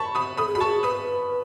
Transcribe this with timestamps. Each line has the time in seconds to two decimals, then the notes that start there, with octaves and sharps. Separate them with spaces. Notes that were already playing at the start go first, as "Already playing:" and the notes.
Already playing: A5 B5 C#6
0.15 B5 D#6
0.37 A4 B5 D#6
0.47 G#4
0.55 F#4 B5
0.60 A5 C#6
0.65 G#4
0.83 B4 B5 D#6